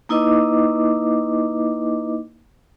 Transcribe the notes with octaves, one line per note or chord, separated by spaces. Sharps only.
A#3 D#4 E4 B4 D#5 D6